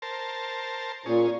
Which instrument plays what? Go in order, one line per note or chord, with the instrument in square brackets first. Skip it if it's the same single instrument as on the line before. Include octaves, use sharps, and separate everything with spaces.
[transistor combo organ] A#4 C5 A5
[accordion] A#2 [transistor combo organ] C#4 G#4